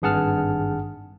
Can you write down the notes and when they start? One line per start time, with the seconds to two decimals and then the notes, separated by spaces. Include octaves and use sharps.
0.02 G#1 G2 G#4 F#5 A5 F6